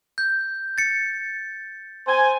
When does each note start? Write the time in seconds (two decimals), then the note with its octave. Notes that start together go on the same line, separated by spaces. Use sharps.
0.18 G6
0.78 A6 C#7
2.07 C5 G#5